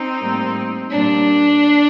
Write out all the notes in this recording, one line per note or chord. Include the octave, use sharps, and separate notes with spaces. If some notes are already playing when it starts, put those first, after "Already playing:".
Already playing: C4 D#4
A2 G3 A#3
A#2 G3 A#3 D4